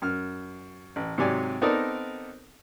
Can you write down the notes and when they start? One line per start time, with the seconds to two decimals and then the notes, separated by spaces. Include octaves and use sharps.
0.02 F#2 F6
0.96 A1
1.18 G#2 C3 F#3 G4 D5 G#5
1.61 B3 C4 D#4 A4 A#4 D5